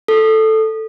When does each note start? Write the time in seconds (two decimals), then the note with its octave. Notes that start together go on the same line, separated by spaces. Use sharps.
0.08 A4